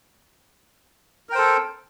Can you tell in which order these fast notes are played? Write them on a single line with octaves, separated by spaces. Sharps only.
A#4 G5 C5 A4